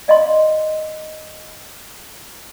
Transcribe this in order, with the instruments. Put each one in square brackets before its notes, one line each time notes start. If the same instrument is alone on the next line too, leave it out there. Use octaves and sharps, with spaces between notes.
[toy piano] D5 D#5 F5 C6